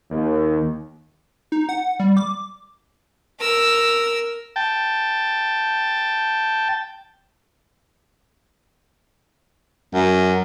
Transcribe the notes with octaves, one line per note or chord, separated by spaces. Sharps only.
D#2
D#4
F#5
G3
D6
A#4 E6
G5 A5
F#2